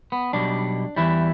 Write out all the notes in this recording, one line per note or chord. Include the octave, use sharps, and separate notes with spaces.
B3
B1 B2 G3 D4
E2 E3 G3 E4